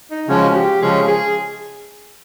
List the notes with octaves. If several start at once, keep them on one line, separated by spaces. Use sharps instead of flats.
D#4
C#3 F3 G#3 C#4 F#4
G4
C#3 F3 G#3 C#4 G#4
G#4